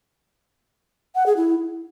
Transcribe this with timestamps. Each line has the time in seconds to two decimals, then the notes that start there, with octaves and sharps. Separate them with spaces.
1.15 F#5
1.26 G#4
1.37 E4